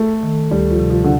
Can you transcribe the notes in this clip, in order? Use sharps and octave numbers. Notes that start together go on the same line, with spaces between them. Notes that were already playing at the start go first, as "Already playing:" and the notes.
Already playing: A3
D#3
D2 G3
F3
C3
F3
D3